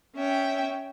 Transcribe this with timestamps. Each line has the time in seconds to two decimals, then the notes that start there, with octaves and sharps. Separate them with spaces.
0.14 C#4 E5 G5